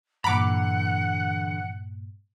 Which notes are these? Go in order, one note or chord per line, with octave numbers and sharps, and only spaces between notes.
G2 A#2 D3 E3 F#5 A#5 B5 D6